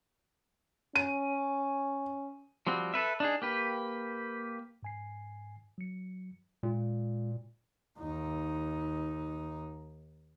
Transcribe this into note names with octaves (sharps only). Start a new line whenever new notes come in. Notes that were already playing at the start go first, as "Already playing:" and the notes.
C#4 D#7
F3 G3 C4 F#4
A4 B4 E5
D4 D#4 G#4
A#3 G4 B4
G#2 G#5 C7
F#3 C#7
A#2 G#3 F4
D#2 D#4